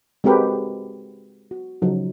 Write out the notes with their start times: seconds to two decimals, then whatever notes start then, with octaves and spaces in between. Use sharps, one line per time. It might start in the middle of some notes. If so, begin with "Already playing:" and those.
0.24 G#3 C4 F#4 G4 A#4 B4
1.51 F#4
1.82 C#3 F3 F#3 D#4